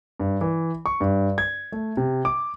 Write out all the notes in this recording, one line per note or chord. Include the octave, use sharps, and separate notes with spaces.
G2
E3
C#6
G2
G#6
A3
C3
D6